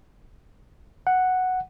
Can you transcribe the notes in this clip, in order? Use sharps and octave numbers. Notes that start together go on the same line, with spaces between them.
F#5